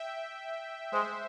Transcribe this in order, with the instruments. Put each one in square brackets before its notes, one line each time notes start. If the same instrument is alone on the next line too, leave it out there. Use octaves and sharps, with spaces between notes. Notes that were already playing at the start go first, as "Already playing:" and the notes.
Already playing: [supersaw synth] E5 G5
[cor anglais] G#3 [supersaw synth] C5 E5